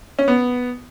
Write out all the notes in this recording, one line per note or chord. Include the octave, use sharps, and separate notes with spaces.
C#4
B3